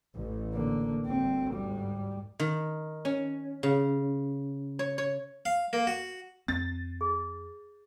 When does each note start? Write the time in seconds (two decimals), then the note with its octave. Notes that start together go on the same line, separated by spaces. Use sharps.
0.14 A1 A2
0.53 D3 A#3
1.06 G1 D2 C4
1.55 G#2 G3
2.39 D#3
3.05 C#4
3.63 C#3
4.79 C#5
4.98 C#5
5.45 F5
5.73 A#3
5.87 F#4
6.48 F2 C4 A6
7.01 G#4